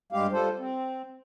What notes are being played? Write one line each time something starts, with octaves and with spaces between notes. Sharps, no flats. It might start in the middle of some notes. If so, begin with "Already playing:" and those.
G2 G3 G#3 G4 F5
G3 F4 A4 C5
C4